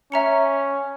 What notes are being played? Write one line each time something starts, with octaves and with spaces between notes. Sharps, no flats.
C#4 E5 A#5 C#7